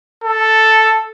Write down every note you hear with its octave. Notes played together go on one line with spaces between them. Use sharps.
A4